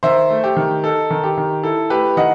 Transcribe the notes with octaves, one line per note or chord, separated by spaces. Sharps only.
D#3 C5 E5
A3
G4
D#3
D#4 A4
D#3
G4
D#3
E4 A4
A3 G4 B4
D#3 D#5 F#5